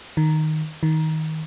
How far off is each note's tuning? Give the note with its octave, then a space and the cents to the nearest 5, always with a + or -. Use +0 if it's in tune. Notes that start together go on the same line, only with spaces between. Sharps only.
D#3 +0
D#3 +20